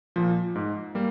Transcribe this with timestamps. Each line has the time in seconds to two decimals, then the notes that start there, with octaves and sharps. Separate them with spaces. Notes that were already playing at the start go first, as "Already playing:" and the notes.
0.16 A#2 F3
0.55 G#2
0.95 G3 A#3